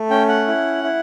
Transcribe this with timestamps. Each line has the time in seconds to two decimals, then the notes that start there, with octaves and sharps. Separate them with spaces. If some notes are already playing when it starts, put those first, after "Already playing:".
Already playing: A3
0.10 C#4 G5
0.28 F#5
0.47 E4
0.84 E4